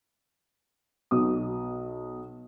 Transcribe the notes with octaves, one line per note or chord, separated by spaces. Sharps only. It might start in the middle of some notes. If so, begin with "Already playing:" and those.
B1 D#6